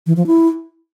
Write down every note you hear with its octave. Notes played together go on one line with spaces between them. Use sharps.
E3
F3
E4